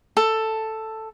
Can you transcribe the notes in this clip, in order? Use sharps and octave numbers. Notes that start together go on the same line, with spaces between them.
A4